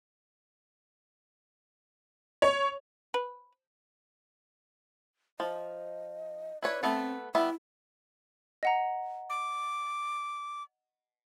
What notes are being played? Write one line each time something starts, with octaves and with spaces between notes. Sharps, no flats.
C#5
B4
F3 D#5
E4 B4 C#5 D5
A3 B3 C4 A4
G3 B3 E4 E5
D#5 F#5 A#5
D6